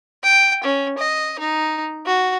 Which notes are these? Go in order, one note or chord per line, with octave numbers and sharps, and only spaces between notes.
G5
C#4
D#5
D#4
F#4